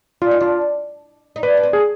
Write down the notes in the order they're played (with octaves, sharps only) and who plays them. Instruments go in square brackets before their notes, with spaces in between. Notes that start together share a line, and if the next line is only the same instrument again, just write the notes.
[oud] D4 [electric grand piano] F4
[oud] D#4
[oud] D4 [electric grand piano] F4
[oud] D#4
[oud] D4 [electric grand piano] B4
[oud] D4
C4
[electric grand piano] G#4